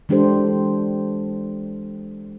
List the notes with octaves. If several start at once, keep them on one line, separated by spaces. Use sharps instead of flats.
E3 G#3 D4 G4 A4 C5